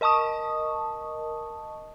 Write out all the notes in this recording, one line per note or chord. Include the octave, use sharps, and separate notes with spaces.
A#4 D#5 A5 C#6 D#6